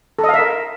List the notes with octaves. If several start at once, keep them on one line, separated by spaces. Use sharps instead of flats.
A4
D#5
F5
E5
A#4